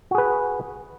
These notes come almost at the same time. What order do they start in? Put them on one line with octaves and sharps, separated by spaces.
F#4 G#4 B4